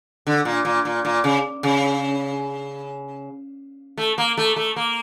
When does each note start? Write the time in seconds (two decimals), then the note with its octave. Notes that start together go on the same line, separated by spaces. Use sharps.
0.27 D3
0.45 A#2
0.65 A#2
0.85 A#2
1.05 A#2
1.24 C#3
1.63 C#3
3.98 A3
4.18 A#3
4.37 A3
4.56 A3
4.76 A#3